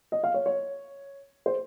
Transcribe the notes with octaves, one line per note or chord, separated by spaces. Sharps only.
D#5
F5
C#5
C#5
C5